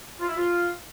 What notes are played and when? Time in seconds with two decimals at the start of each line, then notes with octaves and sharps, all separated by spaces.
0.20 F4
0.28 E4
0.36 F4